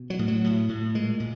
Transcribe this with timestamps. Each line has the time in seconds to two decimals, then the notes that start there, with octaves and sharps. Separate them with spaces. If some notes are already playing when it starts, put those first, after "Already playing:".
Already playing: B2
0.10 F#3
0.19 A2
0.28 F#3
0.44 A2
0.69 A2
0.94 A#2 G#3
1.20 A#2